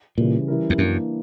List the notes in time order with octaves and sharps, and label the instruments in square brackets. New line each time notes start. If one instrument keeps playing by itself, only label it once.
[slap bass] A#2 [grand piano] C#3 E3 G3 C#4
[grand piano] E3 G3 C#4 E4 A#4
[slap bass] E2
[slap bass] F#2 [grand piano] E3 A#3 D4